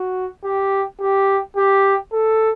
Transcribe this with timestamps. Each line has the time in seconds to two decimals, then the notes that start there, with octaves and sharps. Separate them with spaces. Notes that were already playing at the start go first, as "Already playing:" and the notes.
Already playing: F#4
0.44 G4
1.01 G4
1.56 G4
2.12 A4